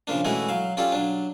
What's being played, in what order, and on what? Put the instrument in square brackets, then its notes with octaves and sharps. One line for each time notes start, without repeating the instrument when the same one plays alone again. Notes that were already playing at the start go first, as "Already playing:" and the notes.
[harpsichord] C#3 F3 A#3 D4
E3 G#3 A3 C#4 E4 F#4
F#3 F5
C#4 F4 G4 A4 D5
F#3 D4